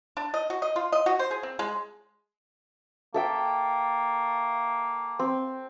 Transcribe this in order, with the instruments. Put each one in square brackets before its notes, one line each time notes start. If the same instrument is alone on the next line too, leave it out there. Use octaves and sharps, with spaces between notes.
[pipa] D4
D#5
F#4
D#5
F4
D#5
F#4
C5
G#4
C4
G#3
[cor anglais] A#3 [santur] A4 E5 G5
[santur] C4